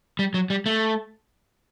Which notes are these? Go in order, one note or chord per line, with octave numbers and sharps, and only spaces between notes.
G3
F#3
G3
A3